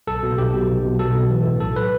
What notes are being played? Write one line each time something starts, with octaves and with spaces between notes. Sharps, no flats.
B1 A4
B2
B1 G4
B2
B1
B2
B1 A4
B2
E3
A2
B1 A4
B4